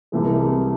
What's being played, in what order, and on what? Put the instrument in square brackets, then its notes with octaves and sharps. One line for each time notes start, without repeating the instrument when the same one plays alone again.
[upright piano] C2 C3 E3 G#3